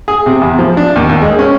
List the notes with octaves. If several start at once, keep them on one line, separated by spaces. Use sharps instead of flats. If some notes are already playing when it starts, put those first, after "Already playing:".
G#4
C3
E2
F3
D4
D#2
D#2
G#3
C#4